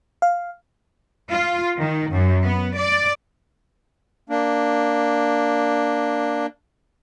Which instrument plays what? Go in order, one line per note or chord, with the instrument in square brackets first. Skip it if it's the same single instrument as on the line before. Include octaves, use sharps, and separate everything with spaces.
[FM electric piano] F5
[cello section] F4
D#3
F#2
B3
D5
[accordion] A#3 D4